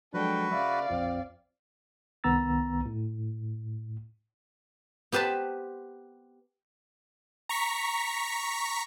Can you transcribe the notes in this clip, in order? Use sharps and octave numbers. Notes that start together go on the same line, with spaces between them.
F3 F#3 G#3 D4 F#4 A4 B4 G5
C#3 D5 E5 F5 B5
A#1 F2 C4 F4
C2 D#3 B3 A#5 E6 A6
A2
B3 G4 B4 C5 A5
A#5 C#6 B6